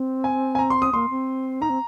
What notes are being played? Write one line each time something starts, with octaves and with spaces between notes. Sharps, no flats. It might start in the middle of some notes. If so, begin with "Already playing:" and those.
Already playing: C4
G#5
G#5
A#5
C6
D#6
A#3 C6
C4
D#4 A#5
C4